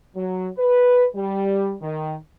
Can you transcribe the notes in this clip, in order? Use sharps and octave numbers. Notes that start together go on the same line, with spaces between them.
F#3
B4
G3
D#3